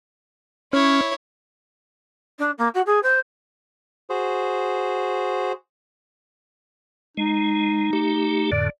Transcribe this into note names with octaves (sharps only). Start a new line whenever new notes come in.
C#4 E4 C#5
D4
A#3
F#4
G#4
C5
F#4 G#4 C5
G#3 D#4
A3 G4
F2 A2 D3 D5